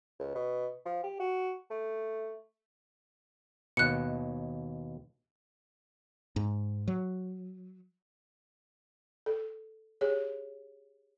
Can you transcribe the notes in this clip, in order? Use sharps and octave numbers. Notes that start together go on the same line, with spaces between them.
C#2
B2
F3
G4
F#4
A3
D#2 B2 F#6 C#7
G#2
F#3
A4
G4 G#4 C#5